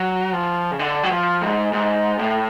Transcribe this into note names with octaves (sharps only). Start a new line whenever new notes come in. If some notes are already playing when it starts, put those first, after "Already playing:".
Already playing: F#3
F3
C#3
D3
F#3
F3
G#2
G#2
A2